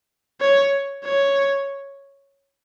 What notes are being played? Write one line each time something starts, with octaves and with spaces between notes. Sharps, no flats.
C#5
C#5